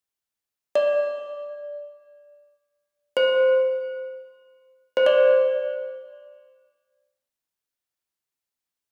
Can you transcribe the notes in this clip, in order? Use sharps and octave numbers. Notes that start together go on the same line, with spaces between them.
D5
C5
C5
D5